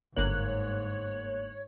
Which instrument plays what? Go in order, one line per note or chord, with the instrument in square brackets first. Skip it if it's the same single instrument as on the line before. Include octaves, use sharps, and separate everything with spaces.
[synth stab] G1 A#3 F#6 [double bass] G#2 [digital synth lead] C#5